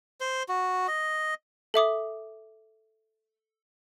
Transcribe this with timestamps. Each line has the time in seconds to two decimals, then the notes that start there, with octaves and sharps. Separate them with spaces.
0.21 C5
0.49 F#4
0.88 D#5
1.74 A4 E5 D6 D#6